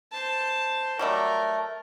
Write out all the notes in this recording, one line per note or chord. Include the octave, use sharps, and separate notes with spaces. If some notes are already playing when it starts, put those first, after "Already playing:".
C5 A5
F#3 G3 A3 A#4